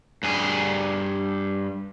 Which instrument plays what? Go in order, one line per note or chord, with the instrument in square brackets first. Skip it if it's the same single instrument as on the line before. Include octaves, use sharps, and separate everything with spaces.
[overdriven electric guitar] G2 G#4